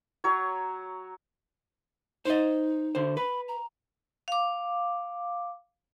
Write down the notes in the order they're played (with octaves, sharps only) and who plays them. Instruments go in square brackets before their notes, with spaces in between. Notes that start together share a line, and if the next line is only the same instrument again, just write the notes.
[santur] F#3 C#5
[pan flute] D#4 [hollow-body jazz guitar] C5 D#5
[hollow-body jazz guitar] D3 C5
[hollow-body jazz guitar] B4 [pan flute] B5
[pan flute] A#5
[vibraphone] F5 D6